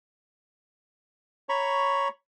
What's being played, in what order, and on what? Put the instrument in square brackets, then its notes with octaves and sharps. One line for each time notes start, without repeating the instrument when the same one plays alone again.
[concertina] C#5 A#5 B5 C#6